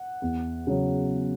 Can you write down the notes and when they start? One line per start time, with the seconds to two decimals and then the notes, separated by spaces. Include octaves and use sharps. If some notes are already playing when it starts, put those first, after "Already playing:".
Already playing: F#5
0.22 E2
0.67 C#3 F#3